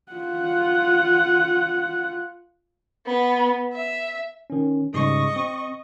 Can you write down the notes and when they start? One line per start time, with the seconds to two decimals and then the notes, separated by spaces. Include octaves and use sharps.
0.12 F4 F#5
3.06 B3
3.73 E5
4.50 D#3 C#4
4.94 G#2 C#3 G3 D#5 C#6
5.36 C4